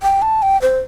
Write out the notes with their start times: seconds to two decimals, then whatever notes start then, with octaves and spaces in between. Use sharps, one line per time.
0.03 G5
0.22 A5
0.42 G5
0.62 C5